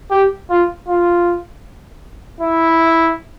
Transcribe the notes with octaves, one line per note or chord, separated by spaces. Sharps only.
G4
F4
F4
E4